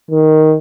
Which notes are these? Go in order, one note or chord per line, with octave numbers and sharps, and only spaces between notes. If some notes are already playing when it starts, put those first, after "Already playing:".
D#3